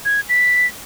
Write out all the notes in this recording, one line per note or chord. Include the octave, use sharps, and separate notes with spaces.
G#6
B6